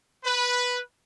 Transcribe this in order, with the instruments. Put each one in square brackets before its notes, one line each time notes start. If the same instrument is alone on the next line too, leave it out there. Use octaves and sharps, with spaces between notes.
[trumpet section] B4